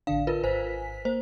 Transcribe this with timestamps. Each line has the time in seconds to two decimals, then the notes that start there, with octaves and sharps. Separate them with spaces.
0.07 A1 D3 D4 F5
0.27 F4 A#4 B4
0.44 G#1 C5 G#5 B6
1.05 A#3 C5